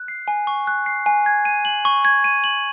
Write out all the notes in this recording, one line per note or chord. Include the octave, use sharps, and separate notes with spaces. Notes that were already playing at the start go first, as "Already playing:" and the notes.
Already playing: F#6
C7
G#5
C#6
F#6
C7
G#5
G#6
D#7
F#7
C#6
G#6
D#7
F#7